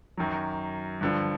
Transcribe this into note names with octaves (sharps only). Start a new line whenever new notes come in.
F#2 D#3 F#3
G2 D3 F3